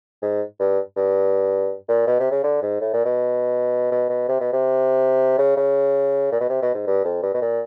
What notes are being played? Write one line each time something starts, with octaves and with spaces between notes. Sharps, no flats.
G#2
G2
G2
A#2
B2
C3
C#3
D3
G#2
A2
A#2
B2
B2
B2
C3
B2
C3
C#3
C#3
A#2
B2
C3
B2
G#2
G2
F2
G2
B2
A#2